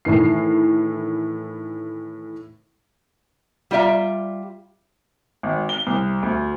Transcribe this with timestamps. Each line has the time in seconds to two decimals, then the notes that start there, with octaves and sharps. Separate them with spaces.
0.05 A2 D#3 E3 C7
3.71 G3 F4 D5 E5 A#5
5.43 G#1
5.69 G7
5.87 C2
6.23 D2